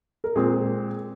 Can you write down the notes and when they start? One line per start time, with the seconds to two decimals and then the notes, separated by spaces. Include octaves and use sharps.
0.24 A#4
0.35 A#2 G#3 C4 G#4